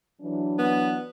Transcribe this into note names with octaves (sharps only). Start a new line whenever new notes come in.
E3 F#3 D4
B3